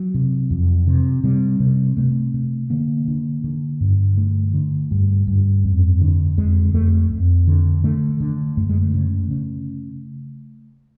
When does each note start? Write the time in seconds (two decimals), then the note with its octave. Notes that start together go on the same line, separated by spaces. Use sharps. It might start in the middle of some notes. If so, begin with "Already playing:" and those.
Already playing: F#3
0.14 C3
0.50 F2
0.87 C3
1.24 C3 G3
1.60 C3
1.97 C3 A3
2.34 C3
2.70 D3 A#3
3.08 D3
3.44 D3
3.81 G2
4.17 D3 A3
4.54 D3
4.91 G2
5.27 G2
5.64 F2
6.01 D3
6.37 F2 G#3
6.74 F2 A3
7.11 F2
7.47 D3
7.84 D3 A3
8.20 D3
8.57 F#2 A3
8.69 G#3
8.82 A3
8.94 C#3
9.31 C#3